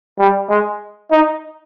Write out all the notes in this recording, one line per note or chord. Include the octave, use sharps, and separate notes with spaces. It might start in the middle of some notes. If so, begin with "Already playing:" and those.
G3
G#3
D#4